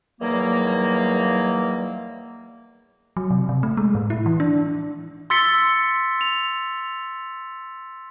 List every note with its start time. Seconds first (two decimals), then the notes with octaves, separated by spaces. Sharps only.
0.21 E2 D#3 F#3 G3 A#3
3.17 F#3
3.30 C3
3.49 C3
3.63 A3
3.77 G#3
3.95 A2
4.10 E4
4.26 E3
4.40 D4
5.30 C6 E6 A6 B6 C#7 G7
6.21 F7